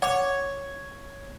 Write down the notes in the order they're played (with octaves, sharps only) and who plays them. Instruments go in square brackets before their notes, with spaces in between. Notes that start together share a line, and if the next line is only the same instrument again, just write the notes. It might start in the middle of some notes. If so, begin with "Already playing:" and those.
[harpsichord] C#5 [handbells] F#5 D6